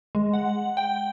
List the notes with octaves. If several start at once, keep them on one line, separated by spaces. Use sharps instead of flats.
G#3
F#5
G5